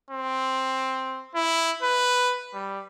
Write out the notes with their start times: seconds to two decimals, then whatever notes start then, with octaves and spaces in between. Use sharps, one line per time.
0.11 C4
1.35 E4
1.83 B4
2.54 G3